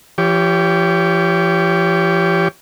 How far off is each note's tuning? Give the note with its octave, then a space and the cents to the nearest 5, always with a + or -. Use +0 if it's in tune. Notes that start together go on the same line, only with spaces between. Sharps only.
F3 -45 G4 +0 C#5 +30